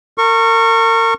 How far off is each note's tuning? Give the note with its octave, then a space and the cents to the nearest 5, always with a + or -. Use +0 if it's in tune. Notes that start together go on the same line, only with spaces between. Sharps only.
A#4 -35 C#6 -15